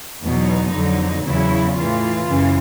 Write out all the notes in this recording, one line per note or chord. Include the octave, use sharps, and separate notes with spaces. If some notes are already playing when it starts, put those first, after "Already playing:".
E2 B2 F#3 D#4
F2 D3 F#3
E2 C#3 F#3 E4
A2 E3 F4
F#2 C#3 E3